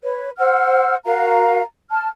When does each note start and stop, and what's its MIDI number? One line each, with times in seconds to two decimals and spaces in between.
0.03 0.30 71
0.03 0.30 73
0.38 0.96 72
0.38 0.96 78
0.38 0.96 88
0.38 0.96 89
1.05 1.62 66
1.05 1.62 70
1.05 1.62 77
1.05 1.62 82
1.91 2.07 81
1.91 2.07 89